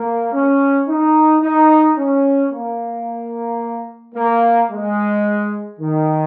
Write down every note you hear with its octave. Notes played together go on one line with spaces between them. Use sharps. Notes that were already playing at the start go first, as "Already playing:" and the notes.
Already playing: A#3
C#4
D#4
D#4
C#4
A#3
A#3
G#3
D#3